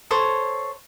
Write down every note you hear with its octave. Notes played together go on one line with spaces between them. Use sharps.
A4 C5 C#5